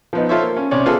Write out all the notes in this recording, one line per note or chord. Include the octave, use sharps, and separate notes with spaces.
F3 B3 D#4
F4 A4 C5 C#5 E5
A#3
C#4
C3 C#4 C#5 D5
B3 F4 G#4 A4